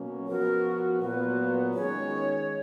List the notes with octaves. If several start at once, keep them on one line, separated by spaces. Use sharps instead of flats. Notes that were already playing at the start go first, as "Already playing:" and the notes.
Already playing: B2 F#3 A#3 C#4
F3 B3 F#4 A#4
A#2 F#3 B3 F4 B4
D#3 G#3 C#4 G#4 C#5